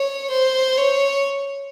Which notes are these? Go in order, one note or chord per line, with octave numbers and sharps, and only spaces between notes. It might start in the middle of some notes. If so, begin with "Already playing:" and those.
Already playing: C#5
C5
C#5